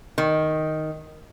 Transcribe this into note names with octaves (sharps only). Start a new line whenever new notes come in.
D#3